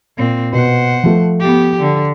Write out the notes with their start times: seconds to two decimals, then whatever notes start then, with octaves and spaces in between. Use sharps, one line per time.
0.18 A#2 C4
0.53 B2 C5 F#5
1.03 F3 A3
1.40 B3 G4
1.81 D3